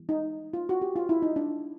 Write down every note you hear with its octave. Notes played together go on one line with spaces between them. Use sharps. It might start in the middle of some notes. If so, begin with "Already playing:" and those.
Already playing: E3 G3 B3
D#4
F4
F#4
G4
F4
E4
D#4
D4